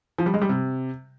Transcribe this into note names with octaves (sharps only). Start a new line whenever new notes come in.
F3
G3
G#3
G3
C3